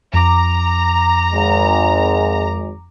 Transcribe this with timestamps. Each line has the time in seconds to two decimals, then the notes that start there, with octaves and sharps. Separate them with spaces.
0.14 F2 A#5 D6
1.33 G#1 G#3